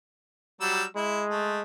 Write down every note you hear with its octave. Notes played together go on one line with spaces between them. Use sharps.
F#3 G3 E6
G#3 E4
A3